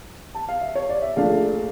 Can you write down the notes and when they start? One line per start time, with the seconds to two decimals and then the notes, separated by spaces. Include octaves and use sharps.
0.35 A5
0.49 F5
0.62 E5
0.75 C#5
0.89 D5
1.02 E5
1.16 A#1 A#2 A3 D4 F5